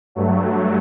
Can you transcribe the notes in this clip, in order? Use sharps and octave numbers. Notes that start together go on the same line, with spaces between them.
G2 F#3 A3